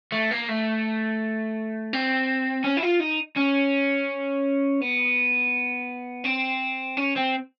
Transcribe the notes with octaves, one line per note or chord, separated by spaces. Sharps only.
A3
A#3
A3
C4
C#4
E4
F4
D#4
C#4
B3
C4
C#4
C4